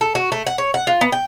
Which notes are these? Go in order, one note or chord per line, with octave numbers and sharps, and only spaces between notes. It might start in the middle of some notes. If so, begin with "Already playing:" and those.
A4
F#4
A3
F#5
C#5
F#5
F4
B3
G5